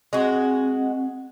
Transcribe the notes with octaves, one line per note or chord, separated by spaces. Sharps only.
G#3 C4 F#4